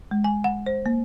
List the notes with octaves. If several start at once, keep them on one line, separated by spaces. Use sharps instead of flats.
G#3
G#5
F#5
C5
A#3